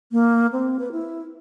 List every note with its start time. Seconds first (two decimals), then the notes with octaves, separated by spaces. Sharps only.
0.12 A#3
0.52 C4
0.79 B4
0.92 E4